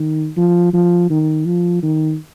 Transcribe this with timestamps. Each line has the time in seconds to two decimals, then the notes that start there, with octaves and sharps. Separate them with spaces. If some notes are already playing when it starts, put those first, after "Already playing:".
Already playing: D#3
0.37 F3
0.73 F3
1.10 D#3
1.46 F3
1.83 D#3